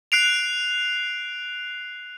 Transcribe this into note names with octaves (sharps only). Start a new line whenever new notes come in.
F#6 C7 D7 F7